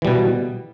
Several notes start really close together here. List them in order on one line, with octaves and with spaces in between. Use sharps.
E3 G3 B2